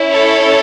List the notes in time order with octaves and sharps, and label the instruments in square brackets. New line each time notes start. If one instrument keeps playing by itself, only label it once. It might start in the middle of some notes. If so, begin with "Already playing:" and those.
Already playing: [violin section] C#4 E4
A4 C#5